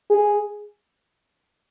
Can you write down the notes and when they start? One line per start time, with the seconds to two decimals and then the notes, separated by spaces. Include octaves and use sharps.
0.10 G#4